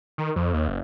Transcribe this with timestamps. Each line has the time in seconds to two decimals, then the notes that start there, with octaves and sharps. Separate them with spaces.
0.18 D#3
0.36 F2
0.53 D#2
0.68 F#1